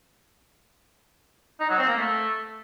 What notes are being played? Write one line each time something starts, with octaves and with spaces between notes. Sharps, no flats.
D#4
F#3
C4
A#3
A3